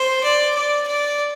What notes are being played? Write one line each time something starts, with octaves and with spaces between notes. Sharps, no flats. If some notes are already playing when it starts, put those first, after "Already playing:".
Already playing: C5
D5
D5
D5